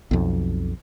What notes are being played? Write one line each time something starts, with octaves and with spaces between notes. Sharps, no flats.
B1 F2